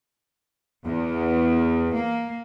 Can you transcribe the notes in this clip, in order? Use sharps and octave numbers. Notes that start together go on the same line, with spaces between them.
E2
A#3